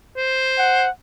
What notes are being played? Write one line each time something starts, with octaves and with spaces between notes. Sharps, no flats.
C5
F#5